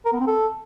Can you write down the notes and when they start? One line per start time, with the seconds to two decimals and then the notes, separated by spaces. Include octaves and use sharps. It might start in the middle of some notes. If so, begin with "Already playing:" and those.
0.05 A#4
0.13 B3
0.20 C4
0.27 A4